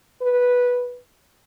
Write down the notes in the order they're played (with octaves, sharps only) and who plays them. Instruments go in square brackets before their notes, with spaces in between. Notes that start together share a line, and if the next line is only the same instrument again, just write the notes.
[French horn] B4